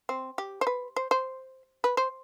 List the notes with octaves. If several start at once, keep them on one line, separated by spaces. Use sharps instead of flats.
C4
G4
C5
B4
C5
C5
B4
C5